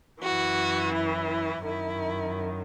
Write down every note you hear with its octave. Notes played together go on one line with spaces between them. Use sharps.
F#2 E3 F#4
E4
F#2 D#3 E4